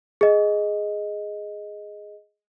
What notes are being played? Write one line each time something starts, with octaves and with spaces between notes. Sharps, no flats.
G#4 D#5